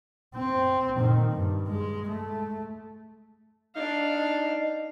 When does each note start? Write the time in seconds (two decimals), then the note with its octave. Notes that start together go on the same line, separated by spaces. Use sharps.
0.35 C4
0.98 A#2 D#3
1.31 G2
1.68 G#3
2.09 A3
3.76 D4 D#4 D#5 F5